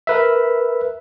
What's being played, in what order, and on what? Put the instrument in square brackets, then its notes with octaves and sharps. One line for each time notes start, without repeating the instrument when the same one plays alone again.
[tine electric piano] A#4 B4 E5